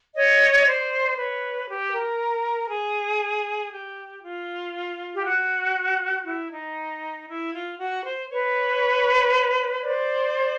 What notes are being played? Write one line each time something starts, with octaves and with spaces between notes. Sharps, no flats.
C#5 D#5
C5 D5
B4 C#5
G4
B4
A#4
G#4
G4
F4
G4
F#4
E4
D#4
E4
F4
F#4
C5
B4 C#5
C5 D5